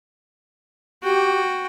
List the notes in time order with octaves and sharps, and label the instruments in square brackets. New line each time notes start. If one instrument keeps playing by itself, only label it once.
[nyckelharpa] F#4 G5 [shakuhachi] G4